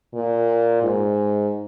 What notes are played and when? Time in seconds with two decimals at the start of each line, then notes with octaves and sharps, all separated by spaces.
0.14 A#2
0.83 G#2